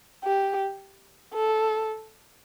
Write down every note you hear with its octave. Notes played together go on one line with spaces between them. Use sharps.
G4
A4